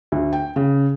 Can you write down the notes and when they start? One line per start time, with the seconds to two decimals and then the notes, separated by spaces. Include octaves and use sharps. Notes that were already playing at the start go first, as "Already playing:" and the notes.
0.12 D2
0.33 G5
0.56 C#3